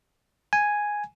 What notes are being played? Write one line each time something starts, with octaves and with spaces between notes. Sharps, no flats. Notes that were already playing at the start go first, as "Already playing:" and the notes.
G#5